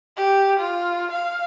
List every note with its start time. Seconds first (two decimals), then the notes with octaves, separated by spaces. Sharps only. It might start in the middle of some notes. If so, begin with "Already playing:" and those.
0.17 G4
0.60 F4
1.12 F5